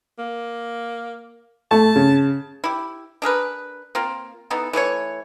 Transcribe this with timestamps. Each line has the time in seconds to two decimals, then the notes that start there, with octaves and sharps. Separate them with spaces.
0.19 A#3
1.71 A3 A5
1.96 C#3
2.64 E4 G4
3.22 D4 G#4 A#4 B4
3.95 A#3 C4 F4
4.50 E3 B3 D#4 A4
4.73 E3 A3 G#4 C#5